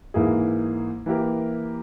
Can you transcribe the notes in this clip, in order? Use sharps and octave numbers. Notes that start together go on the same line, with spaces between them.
G#2 E3 A#3 E4 G#4
E3 A#3 E4 G4 A#4